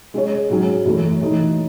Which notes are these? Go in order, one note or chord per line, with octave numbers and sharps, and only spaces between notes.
G#3 C#4 G#4 C#5
G#2 F#3 C#4 G#4
F#2 E3 A3
E3 A3 D#4